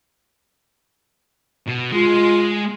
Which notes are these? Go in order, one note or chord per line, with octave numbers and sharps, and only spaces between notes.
B2
G#3 F4